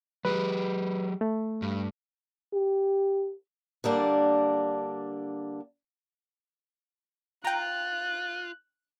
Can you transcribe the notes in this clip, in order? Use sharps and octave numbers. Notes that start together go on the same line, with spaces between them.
F#3 G4 G#4 B4
A3
G2
G4
D3 G3 A#3 D4
F4 G5 A#5 F#6